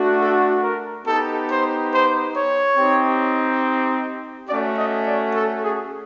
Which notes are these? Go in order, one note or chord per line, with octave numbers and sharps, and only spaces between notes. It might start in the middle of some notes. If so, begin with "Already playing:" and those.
Already playing: A3 D4 F#4
A4
A#4
B3 D#4 G4 A4
C5
C5
C#5
C4 D#4 G4
A3 C#4 F#4 D5
D#5
D5
A4
G#4